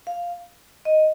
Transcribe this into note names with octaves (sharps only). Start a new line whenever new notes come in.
F5
D#5